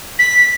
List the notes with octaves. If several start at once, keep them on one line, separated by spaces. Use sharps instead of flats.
B6